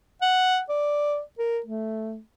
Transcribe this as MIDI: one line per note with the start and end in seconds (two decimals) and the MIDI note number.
0.22 0.61 78
0.69 1.20 74
1.39 1.60 70
1.66 2.18 57